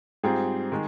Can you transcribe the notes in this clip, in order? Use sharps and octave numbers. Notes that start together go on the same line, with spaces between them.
G#2 G3 C4 F4 G#4
D#3 G#3